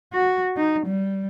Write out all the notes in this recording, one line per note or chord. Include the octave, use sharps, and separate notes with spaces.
F#4
D#4
G3